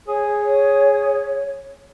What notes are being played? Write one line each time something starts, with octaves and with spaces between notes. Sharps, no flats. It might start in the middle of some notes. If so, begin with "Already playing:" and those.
G#4 C#5